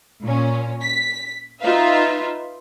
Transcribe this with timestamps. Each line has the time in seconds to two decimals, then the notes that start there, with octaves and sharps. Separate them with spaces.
0.23 A#2 C#4
0.81 B6
1.60 D#4 F4 B4 E5 F5